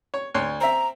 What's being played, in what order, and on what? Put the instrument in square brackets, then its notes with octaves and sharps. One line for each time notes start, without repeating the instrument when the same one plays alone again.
[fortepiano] C#5
D2 C#5 C6
[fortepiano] C4 E5 [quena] A#5